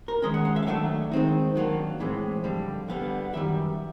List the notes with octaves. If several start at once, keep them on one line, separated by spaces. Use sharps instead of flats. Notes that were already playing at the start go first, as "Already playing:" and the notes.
A#4
D#3 G#3 C#4 D#5
F#5
F5
E5
F5
D#3 F#3 A3 D4 E5
D#3 G#3 C4 D#4
D#3 F#3 A#3 D4
A2 E3 G#3 C4
F2 D3 G3
D3 G3 B3 F5
F#2 D#3 G3 E5